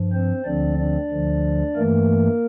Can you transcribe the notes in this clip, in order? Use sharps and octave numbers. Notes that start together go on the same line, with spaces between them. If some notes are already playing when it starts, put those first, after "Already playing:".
Already playing: G2 F3
C4 C5
D2 D3 F3 C4 D4 D5
D4 D5
D2 D3 F3
G2 E3 A3 A#3 A#4